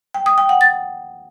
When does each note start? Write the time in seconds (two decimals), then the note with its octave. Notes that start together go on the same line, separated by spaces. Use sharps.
0.14 G5
0.26 D#6
0.38 G5
0.49 F#5
0.61 A6